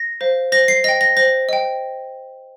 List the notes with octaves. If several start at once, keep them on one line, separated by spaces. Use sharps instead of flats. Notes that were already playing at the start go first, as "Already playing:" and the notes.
Already playing: A#6
C5 F5
C5 A#6
C7
D#5 G5 A#6
A#6
C5 A#6
D#5 G5